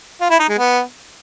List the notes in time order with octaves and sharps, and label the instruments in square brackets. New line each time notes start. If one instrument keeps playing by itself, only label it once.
[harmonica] F4
E4
D#4
G#3
B3